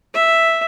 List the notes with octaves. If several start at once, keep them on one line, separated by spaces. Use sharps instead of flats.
E5